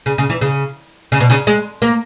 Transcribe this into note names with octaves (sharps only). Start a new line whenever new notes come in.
C#3
C#3
E3
C#3
C#3
B2
C#3
G#3
A#3